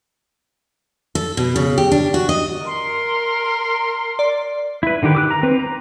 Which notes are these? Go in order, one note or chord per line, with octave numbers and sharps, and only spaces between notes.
A4
B2
C#3
G4
D4
F#4
D#5
A#4 C6
D5
E4 B4
D3 D#3 G4 B4
D6 E6 F#6
A#5
C4 B4
A#5